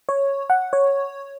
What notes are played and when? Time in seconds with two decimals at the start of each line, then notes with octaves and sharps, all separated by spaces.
0.09 C#5
0.50 F#5
0.73 C#5